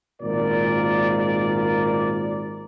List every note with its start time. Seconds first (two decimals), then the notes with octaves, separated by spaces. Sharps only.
0.22 G#1 A#2 A#4 D5